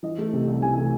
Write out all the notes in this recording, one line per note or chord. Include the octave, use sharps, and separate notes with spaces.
E3 D#5
A3
C3
C2
E3 G#5
A3